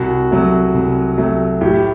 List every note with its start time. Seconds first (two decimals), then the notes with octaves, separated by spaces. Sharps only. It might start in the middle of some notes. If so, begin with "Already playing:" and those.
Already playing: C2 F#4
0.31 C3 F#3 A3
0.74 C2
1.18 C3 F#3 A3
1.61 A2 G4